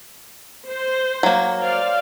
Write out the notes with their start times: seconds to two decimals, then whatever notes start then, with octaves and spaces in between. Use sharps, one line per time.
0.69 C5
1.23 F#3 A#3
1.62 C5 D5 F5